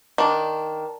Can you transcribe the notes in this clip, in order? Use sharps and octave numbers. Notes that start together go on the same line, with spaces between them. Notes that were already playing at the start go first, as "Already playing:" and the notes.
D#3 D4